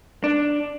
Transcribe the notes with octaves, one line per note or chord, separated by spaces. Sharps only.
D4